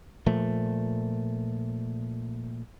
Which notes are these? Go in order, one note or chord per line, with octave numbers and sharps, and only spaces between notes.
A#2 F3 A3